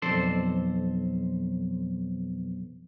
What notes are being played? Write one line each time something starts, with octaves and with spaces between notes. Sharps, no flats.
B1 F2 C4 A4 C5 D5